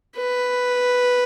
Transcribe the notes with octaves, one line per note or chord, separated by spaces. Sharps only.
B4